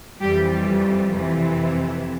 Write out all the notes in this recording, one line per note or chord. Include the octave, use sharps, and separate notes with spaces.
F2 E3 G3 G4
F2 C3 E3